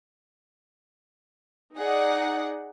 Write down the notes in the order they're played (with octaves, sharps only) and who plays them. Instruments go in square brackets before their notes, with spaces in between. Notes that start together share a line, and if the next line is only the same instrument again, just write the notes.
[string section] D#4 G#4 D5 F#5